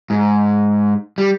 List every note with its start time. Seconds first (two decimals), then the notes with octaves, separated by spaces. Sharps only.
0.10 G#2
1.18 G3